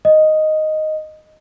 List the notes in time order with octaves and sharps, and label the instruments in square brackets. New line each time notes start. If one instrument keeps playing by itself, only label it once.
[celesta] D#5